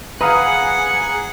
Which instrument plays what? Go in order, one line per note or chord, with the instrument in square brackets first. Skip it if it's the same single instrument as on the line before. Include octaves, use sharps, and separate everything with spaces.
[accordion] G#4 [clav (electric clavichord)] B4 F5 [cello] F#5 [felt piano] A#5 D#6